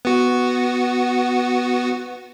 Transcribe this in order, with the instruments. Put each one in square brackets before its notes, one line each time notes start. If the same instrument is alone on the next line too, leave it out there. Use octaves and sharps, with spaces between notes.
[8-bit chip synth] B3 F#4